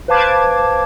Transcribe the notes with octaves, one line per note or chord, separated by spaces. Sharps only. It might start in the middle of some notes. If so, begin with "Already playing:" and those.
B4 C5 F5 A5 D6 G#6